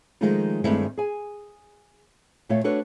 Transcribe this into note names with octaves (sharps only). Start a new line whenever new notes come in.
D#3 F3 G#3 A3 D#4 F4
G2 D#3 G#3 A3 C4 E4
G#4 G#5
A#2 A3 F4 C#5 F5
D4 F#4 A4 B4 C#5